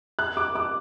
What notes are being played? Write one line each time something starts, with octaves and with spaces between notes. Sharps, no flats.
F#6
D6
D6